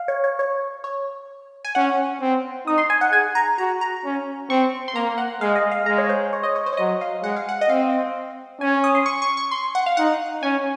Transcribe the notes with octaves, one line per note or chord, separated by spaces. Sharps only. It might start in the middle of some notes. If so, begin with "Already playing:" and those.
Already playing: F5
C#5
C#5
C#5
C#5
G#5
C#4 F#5
C4
D#4 D#6
C6
G#5
F#5
G#4 G#5
A#5
F#4 A#5
A#5
C#4
C4 C#6
C6
A#3 A#5
F#5
G#3 F5
D#5
F5
G#3 A#5
C#5
C5
C#5
D#5
C#5
C5
C#5
F#3 D#5
F5
G#3 F#5
F5
F#5
D#5
C4 F5
C#4 G#5
D#6
C6
C#6
C#6
C#6
C6
F#5
F5
D#4 F#5
C#4 G#5